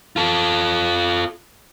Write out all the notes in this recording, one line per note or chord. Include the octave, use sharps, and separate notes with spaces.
F4 A4